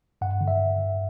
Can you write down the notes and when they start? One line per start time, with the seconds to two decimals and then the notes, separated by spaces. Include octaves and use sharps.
0.21 G2 F#5
0.41 D3
0.48 E5